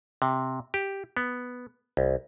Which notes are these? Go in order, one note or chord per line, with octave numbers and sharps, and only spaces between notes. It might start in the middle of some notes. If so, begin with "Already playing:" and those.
C3
G4
B3
C2